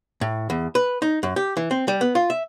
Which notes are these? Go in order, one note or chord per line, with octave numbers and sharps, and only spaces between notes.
A2
E2
B4
D#4
F#2
G4
E3
C4
G3
B3
F4
E5